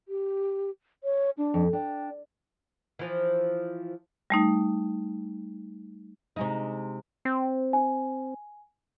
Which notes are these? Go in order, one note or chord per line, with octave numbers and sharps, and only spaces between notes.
G4
C#5
D4
F2
D4 G5
E3 F3
G3 A3 D#4
C3 G#3 D#4
C4
G#5